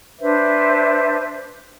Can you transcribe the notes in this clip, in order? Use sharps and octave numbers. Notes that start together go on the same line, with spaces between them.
D4 B4 C5 E5